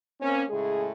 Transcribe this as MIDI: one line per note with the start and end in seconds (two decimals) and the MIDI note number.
0.20 0.43 58
0.20 0.43 60
0.20 0.43 61
0.50 0.90 45
0.50 0.90 49
0.50 0.90 56
0.50 0.90 68